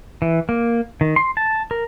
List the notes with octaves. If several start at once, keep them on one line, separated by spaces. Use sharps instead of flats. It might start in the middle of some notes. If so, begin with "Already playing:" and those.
E3
A#3
D#3
C6
A5
A#4